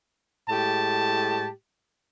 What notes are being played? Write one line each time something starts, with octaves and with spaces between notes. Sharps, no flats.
A2 G#3 G4 A5